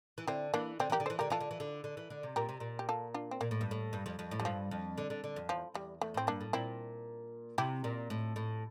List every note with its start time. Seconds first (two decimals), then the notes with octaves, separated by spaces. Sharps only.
0.18 E3
0.27 D3 C4 E4
0.54 E3 A#3 D4
0.80 D3 C4
0.90 E3 G4 A#4
1.00 D3
1.06 A4 C5
1.10 E3
1.19 D3 G4 A#4
1.30 E3 F4 A4
1.40 D3
1.51 E3
1.60 D3
1.84 D3
1.97 E3
2.10 D3
2.23 C3
2.36 A#2 G4 A#4
2.49 C3
2.60 A#2
2.79 G4
2.89 F4 A4
3.14 D4 F4
3.31 C4
3.41 A#2 A#3
3.51 A2
3.61 G2
3.71 A2
3.93 G2
4.06 F2
4.19 F2
4.31 A2
4.40 F2 G3
4.45 G2 F3
4.71 F2
4.98 D3
5.10 D3
5.24 D3
5.36 F2
5.49 E2 F3
5.74 E2 G3
6.02 E2 A3
6.14 A2 C4
6.27 G2 A#3 D4
6.41 A2
6.53 A#2 C4 E4
7.58 C3 E4 G4
7.84 A#2
8.10 A2
8.36 A2